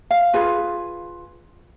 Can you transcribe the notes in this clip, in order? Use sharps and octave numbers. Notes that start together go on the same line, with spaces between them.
F5
F4 G#4 B4